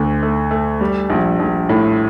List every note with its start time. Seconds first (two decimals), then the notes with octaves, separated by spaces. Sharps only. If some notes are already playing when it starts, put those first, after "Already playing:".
Already playing: D2 A3
0.23 A3
0.51 A3
0.81 G3
1.10 A#1
1.39 A#1
1.69 A2